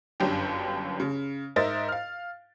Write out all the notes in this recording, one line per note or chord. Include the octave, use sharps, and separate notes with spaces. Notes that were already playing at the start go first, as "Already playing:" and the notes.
G1 F#2 C#4 D4 G4
C#3
G#2 A#4 C5 D#5 E5 A6
F5 F6